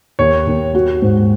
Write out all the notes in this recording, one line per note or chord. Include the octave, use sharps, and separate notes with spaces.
D#2 C#5
D#2
F#4
G#2